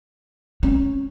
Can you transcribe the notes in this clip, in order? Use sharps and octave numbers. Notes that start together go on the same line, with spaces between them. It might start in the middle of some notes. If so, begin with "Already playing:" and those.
C#4